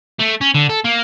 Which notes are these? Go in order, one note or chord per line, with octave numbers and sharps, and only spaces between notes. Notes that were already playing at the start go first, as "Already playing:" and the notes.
A3
C#4
D3
A4
A#3